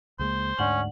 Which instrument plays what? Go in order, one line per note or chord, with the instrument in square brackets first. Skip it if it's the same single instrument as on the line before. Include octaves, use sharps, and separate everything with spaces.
[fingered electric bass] C#2 G#3 A#3 [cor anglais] C5
[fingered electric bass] D2 G#2 D4 [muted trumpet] C#4 [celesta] D5 F#5 F#7